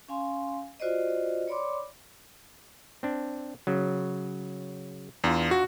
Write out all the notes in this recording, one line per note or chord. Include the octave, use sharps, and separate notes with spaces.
C#4 F5 G#5 C6
F4 F#4 C5 D5 D#5
C#5 D5 B5 C6 D6
C4 D4
C#3 F#3
E2 D4 F4
F#4